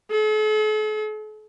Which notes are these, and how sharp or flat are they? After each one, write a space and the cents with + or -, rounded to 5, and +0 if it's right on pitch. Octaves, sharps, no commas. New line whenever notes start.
A4 -45